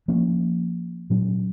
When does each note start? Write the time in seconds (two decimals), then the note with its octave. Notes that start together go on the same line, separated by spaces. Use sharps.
0.08 F3 A#3 C#4
1.10 A#2 F#3 C#4